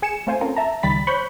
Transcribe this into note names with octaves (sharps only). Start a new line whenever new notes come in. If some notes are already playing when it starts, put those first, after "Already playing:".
G#4 G#5 C#7 E7
A3 C4 F4 C5 G#5
C4 C#4 F4 A4 A#4
E5 A5 A#5
C#2 D#3 G3 B5 A6 B6
C5 C#5 B5 C#6 F#6 G6